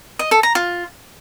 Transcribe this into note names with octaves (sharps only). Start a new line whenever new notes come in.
D#5
A4
A#5
F4